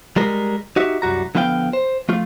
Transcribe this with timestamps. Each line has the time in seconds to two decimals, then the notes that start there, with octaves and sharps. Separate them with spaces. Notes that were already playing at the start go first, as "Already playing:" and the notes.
0.16 G3 G#3 A#4
0.76 D#4 F#4 G4 E5
1.02 C2 F#2 G3 F#4 A#5
1.35 D3 F3 B3 E4 F5 G5
1.73 C5
2.09 F3 A3 F4